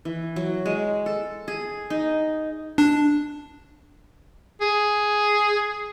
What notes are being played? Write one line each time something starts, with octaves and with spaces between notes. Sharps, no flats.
E3
F#3
G#3
A4
G#4
D#4
D4
G#4